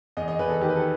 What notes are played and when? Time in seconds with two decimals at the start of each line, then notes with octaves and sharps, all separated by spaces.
0.17 E2 D#5
0.28 D#5
0.39 E2 B4
0.49 A4
0.61 D#3 G4
0.69 B4
0.76 A4